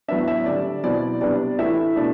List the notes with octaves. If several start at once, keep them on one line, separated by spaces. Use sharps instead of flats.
A2 F#3 B3 D4 E5
E5
D3 G3 D4 D5
B2 F#3 C4 E4 D5
C3 G3 B3 D4 D5
A2 E3 A3 E4 E5
B2 A3 D4